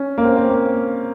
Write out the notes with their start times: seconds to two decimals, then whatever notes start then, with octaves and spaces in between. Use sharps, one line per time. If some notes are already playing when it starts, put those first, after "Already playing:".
Already playing: C#4
0.18 A#3
0.24 C4
0.37 C4
0.50 A#3